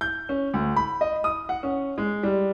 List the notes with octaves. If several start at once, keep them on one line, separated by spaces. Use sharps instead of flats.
G6
C#4
D2
B5
D#5
D#6
F#5
C#4
G#3
G3